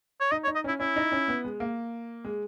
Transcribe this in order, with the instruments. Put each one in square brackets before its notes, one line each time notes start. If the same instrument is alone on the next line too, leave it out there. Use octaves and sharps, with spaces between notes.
[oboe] C#5
[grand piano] D#4 [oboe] D#5
[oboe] C#5
[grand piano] D#4
[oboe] D#5
[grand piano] C#4 [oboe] E4
[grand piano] C#4 [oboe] E4
[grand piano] D#4
C#4
B3
G#3
A#3
G#3